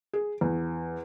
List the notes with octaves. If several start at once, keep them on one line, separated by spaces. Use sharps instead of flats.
G#4
E2